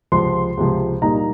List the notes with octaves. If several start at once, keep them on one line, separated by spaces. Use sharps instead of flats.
C#2 C3 F3 C6
C#2 C3 F3
A#2 G3 A#3 D#4 A#5